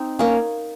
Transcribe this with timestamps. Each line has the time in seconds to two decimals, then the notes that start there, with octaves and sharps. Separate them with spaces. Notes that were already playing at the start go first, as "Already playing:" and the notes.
Already playing: C4 D#4
0.19 A#3 C#4